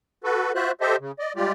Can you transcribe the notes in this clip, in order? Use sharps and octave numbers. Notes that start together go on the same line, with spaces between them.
F#4 A4 B4
F4 F#4 C5 E5 F#6
G4 A4 C5 D#5 E5
C#3
D5 D#5
G3 G#3 F4 G4 D5